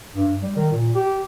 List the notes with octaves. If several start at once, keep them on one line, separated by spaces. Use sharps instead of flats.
G2
G3
D#3
A#2
G4